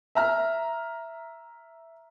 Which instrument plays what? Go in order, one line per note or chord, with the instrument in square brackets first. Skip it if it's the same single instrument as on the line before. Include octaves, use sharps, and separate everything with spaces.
[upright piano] E5 A#5 F6